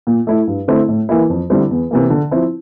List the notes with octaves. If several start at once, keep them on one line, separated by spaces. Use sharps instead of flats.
A#2
A3 E4
G2
D3 A3 C4 E4
A2
E3 A#3 E4
F2
D3 G3 C4 E4
E2
C3 E3 A#3
D3
F3 C4 E4